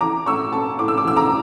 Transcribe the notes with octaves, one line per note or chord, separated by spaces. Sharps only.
E3 A#5 D6
A2 C#6 E6
A2 A5 C#6
A2 D6
E6
D6
E3 E6
A#5 D6